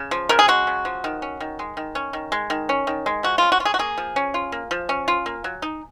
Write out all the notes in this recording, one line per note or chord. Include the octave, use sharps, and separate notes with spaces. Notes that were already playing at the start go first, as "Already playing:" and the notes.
Already playing: C#3
F3
C#3 A#4
G#4
G#3 F#4
C#3
F3
D#3
C#4
D#3
G#3
D#3
C#4
D#3
G#3
D#3
C#4
D#3
G#3
F3 F#4
C#4 F4
F#4
F4
G#4
F#4
A#3 G#4
F3
C#4
F4
A#3
F3
C#4
F4
A#3
F#3
D#4